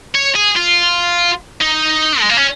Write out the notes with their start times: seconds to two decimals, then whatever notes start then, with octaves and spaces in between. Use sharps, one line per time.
0.15 C#5
0.35 G#4
0.56 F4
1.61 D#4
2.20 G#3
2.30 A#3
2.37 C#4